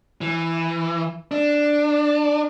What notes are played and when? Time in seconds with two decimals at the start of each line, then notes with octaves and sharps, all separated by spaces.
0.21 E3
1.31 D4